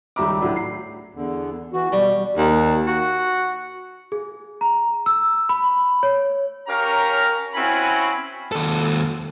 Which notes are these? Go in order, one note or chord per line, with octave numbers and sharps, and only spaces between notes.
C#2 D#3 G3 E5 A#5 D6
A2 F#3 D4 E4
C7
E2 D3
E3 F#4
B2 G3
D#2
F#4
G#4
A#5
E6
B5
C#5
C#4 G4 A#4 C#5 F5 A#5
C4 C#4 E4 F#4 G#5 B5
D#2 A4